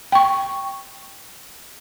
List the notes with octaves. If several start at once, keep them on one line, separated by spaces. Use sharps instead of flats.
G5 C#6